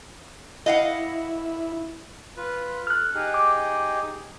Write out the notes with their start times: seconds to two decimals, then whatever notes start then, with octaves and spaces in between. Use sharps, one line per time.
0.66 E4 D#5 F5 F#5
2.37 F4 B4
2.87 A4 F6 F#6
3.15 D#4 G4 G#4
3.34 D6